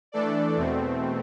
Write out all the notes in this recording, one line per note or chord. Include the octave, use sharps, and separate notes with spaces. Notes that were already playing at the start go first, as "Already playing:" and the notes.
E3 A3 D4 A4 D5
E2 B2 A3 C4